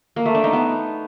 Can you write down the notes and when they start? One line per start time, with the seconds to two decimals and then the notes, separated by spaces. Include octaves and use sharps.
0.16 A#3
0.26 A3
0.35 D4
0.44 D#4
0.53 B3